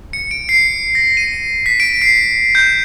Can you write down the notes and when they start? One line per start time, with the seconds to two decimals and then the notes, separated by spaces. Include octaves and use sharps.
0.13 C#7
0.31 D7
0.49 C7
0.95 A#6
1.17 D#7
1.66 B6
1.80 D7
2.02 C7
2.55 G6